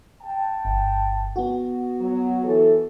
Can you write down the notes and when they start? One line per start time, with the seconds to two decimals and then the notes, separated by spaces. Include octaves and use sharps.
0.22 G5 A5
0.65 G1
1.36 B3 F#4
2.00 F#3
2.44 E3 A4